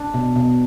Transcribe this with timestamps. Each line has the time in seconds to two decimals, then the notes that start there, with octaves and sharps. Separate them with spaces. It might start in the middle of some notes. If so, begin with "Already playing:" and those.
Already playing: D4
0.14 B2
0.36 B2